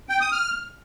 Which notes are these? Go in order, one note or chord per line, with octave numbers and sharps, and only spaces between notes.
G5
D#6
F6